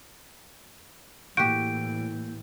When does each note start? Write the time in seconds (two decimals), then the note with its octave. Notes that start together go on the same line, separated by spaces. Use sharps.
1.37 A2 E3 A#3 F#4 G4 G6 D7